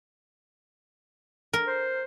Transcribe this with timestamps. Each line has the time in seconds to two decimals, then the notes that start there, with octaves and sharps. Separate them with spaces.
1.53 A#4
1.67 C5